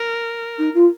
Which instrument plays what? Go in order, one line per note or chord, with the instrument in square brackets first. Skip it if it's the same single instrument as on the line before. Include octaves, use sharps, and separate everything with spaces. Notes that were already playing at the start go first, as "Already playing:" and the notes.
Already playing: [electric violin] A#4
[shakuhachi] D#4
F4